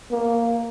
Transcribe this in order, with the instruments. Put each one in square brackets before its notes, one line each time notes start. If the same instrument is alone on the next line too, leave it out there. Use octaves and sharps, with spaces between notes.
[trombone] A#3